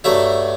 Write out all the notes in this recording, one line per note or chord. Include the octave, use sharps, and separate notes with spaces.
G2 F#3 A3 E5